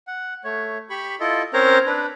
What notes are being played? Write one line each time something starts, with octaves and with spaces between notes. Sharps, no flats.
F#5
A3 C#5
G4 B5 C#6
E4 F4 A4 D#5
C4 C#4 A#4 C5 C#5 A#5
D4 B4